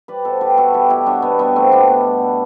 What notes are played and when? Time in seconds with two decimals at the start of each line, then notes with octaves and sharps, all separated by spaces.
0.08 G3 B4 D5
0.25 B2 A4 C5
0.41 G3 G4 B4
0.57 B2 F#4 A4
0.74 G3 E4 G4
0.90 B2 E4 G4
1.06 G3 D4 F#4
1.22 B2 B3
1.39 G3 B3
1.56 B2 A3 C4
1.72 G3 B3 D4
1.88 B2
2.05 G3
2.21 B2